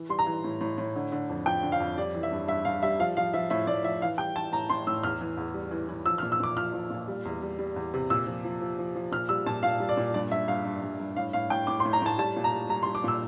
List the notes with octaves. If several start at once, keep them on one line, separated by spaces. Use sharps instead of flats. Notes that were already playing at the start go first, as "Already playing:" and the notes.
Already playing: E3
G3 C6
A#5
E3
A2
A2
A2
D3
D3
F2
F3 G5
D3
F5
F2
G3 D5
E3
E5
G2
G2 E5
G2 F5
G3 E5
F3 F5
F3 F5
F3 E5
A2 E5
A2 D5
F3 E5
E3 F5
G3 G5
E3 A5
A2 A#5
A2 C6
A2 E6
E2 F6
E3
E2
G3
E3
E3
F3 E6
F6
A#2
E6
A#2 D6
F3 F6
F3
A#2
G3
E2
G3
G3
E2
C3
A#2 E6
F3
F3
F3
F3
F3
A#2 F6
G3 E6
A#2 A5
A#2 F5
G3
D5
A#2
G2 D5
G2 E5
G2 F5
G2
G2
G2
A2 F5
A2 F5
A2 G5
A2 D6
C6
A2
A#5
A2 A5
G3 A5
A#2
A#5
G3
G3 A#5
C6
G3
D6
A#2 E6